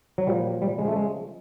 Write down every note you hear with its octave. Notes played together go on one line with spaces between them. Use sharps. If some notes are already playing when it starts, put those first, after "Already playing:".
F#3
A#2 F3 G3
G3
C#3 F3 G#3
A3
G#3